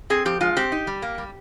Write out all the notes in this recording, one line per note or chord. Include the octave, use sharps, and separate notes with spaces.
C4 G#4
F3 G4
G#3 F4
C4 G4
D#4
G3
A#3
G3